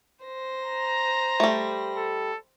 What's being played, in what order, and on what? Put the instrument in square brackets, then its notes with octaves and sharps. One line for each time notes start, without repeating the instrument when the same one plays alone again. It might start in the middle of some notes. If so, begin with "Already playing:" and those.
[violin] C5 A#6
[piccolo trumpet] A#5
[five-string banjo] G3 A3
[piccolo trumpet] A4